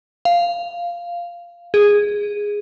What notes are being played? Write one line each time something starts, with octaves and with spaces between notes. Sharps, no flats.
F5
G#4